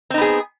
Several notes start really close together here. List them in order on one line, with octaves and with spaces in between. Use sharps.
C4 D#4 B3 G#4